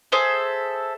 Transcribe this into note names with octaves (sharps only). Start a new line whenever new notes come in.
G#4 A4 C5 E5